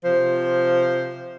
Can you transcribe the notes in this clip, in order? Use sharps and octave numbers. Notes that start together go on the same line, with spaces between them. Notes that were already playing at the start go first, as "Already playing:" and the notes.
C3 F3 C5